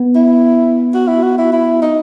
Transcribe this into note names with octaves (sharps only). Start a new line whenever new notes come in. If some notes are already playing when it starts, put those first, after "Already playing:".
Already playing: B3
E4
F#4
E4
F#4
E4
E4
D#4